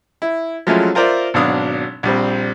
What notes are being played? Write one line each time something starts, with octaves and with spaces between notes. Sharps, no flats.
E4
F3 F#3 G#3 A3 C#4 E4
F4 A#4 C5 D5 E5
G#1 B2 F#3 D4 F5 D#6
A#1 G3 C4